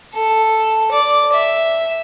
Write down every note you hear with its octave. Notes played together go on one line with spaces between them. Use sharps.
A4
D5
E5